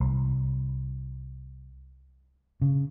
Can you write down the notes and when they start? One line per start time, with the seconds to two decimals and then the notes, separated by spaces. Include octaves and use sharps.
0.01 C2
2.61 C#3